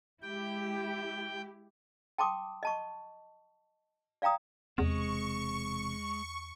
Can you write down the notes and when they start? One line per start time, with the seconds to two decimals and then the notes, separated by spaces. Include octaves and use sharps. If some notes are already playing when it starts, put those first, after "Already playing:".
0.22 G#3 E4 G4 G5
2.18 G5 A5 C6 D6 D#6
2.63 D#5 A5 C#6
4.22 D5 F5 G5 A#5 D#6
4.78 E1 E2 C3 G#3 C4 C#6